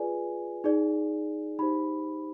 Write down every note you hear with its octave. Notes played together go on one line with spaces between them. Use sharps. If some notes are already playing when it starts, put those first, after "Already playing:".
Already playing: F4 G#4 B4 D5 G#5
D#4 G#4 D5
D#4 G4 C5 B5